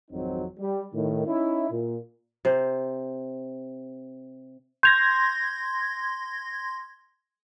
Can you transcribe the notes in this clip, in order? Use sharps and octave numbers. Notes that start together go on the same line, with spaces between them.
G#1 F2 F#3 C4 D#4
G3
A2 D#3
C#4 D#4 E4
A#2
C3 C5
C6 G6 G#6 A#6 F7